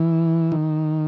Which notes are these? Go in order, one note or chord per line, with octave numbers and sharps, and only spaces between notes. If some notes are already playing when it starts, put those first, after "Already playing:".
Already playing: E3
D#3